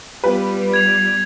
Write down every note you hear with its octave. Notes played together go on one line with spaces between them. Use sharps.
G3 B3 F4 G4 B4
G#6 F7